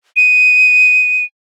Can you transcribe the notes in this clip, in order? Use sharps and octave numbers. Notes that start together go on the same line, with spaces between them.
D#7